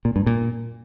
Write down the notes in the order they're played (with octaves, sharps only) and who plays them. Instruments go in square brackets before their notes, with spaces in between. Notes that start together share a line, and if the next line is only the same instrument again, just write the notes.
[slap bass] A#2
G2
A#2